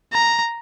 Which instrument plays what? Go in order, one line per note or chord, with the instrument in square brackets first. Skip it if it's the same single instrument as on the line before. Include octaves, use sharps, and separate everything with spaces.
[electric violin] A#5